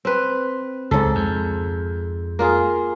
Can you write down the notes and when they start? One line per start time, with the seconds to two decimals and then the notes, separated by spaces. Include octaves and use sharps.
0.05 C4 B4
0.91 C#2 G#2 A4
1.15 F2
2.39 A#3 F4 G#4